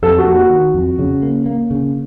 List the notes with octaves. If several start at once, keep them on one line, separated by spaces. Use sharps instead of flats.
F2 A4
F#4
A#3
F#4
D#3
F2
C#3
A#3
A#3
C#3